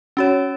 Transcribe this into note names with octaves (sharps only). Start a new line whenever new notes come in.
C#4 F#4 C#5